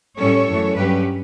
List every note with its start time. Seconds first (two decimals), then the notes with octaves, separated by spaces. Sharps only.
0.19 A2 G3 C#4 A4 C#5
0.48 F#2 E3 A3
0.76 G2 F#3 C#4 G4 B4